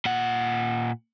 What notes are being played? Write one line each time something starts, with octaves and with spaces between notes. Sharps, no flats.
A#2 F#5